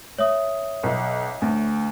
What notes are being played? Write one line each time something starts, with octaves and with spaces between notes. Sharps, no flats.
C#5 E5 D#6
B1
D2